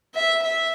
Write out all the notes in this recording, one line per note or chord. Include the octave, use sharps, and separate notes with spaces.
E5
E5